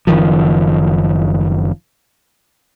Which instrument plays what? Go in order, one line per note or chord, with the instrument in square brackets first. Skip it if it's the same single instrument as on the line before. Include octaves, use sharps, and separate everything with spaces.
[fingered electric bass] F#1 D#3 F3